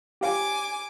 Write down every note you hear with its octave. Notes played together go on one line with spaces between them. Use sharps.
G4 F5 G#5 D6